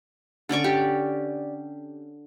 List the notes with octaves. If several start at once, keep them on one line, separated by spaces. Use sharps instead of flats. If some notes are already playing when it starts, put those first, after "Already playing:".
D3 C#4 D5 C#6
G4